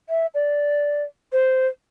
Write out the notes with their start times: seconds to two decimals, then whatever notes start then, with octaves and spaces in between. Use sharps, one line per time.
0.09 E5
0.34 D5
1.32 C5